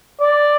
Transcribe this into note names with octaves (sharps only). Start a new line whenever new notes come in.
D5